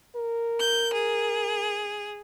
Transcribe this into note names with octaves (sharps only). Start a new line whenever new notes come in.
A#4
G6
G#4